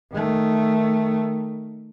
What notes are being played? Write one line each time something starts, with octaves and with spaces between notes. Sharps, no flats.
D#3 A3